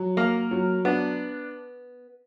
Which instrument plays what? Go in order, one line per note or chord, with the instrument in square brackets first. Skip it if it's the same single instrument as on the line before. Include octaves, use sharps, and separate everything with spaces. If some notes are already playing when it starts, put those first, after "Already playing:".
Already playing: [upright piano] F#3
[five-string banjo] A#3 [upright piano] A#4
[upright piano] F#3
[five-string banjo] B3 [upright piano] D4